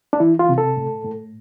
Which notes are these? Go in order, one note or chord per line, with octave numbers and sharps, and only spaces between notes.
D4
E3 E4
F4
C3
A4
A2
A2